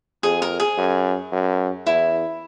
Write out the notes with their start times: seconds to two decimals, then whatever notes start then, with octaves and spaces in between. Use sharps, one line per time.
0.23 F2 G#4
0.42 A#4
0.60 G#4
0.78 F#2
1.32 F#2
1.86 E2 E4